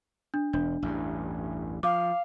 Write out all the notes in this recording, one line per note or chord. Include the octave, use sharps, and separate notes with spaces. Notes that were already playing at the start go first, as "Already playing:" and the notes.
D4
E1 D4
A1 E2 G2
F3 F5 D6